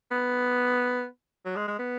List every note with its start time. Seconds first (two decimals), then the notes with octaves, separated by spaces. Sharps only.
0.11 B3
1.45 F#3
1.56 G#3
1.68 G#3
1.79 B3